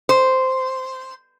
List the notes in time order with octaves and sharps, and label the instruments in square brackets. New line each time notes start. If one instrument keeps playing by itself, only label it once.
[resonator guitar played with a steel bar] C5